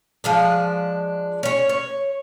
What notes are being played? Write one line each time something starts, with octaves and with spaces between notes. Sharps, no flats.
F3 G#3 D4
C#4 C#5
C#5